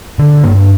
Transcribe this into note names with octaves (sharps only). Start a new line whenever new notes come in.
D3
G2 A#3